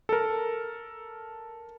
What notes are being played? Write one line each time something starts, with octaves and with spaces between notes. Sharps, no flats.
A4 A#4